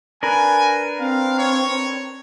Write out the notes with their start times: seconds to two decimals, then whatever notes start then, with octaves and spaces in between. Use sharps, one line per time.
0.23 D4 A#4 B4 G#5
1.00 C4 F5
1.39 C#5